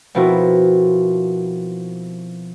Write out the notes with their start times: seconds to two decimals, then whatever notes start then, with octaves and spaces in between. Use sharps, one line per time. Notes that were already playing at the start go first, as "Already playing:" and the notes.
0.15 B2 F3 C4 E4 F#4 A#4